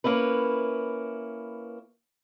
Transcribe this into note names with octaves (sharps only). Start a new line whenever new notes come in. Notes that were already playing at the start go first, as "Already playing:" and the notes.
A#3 C#4 E4 B4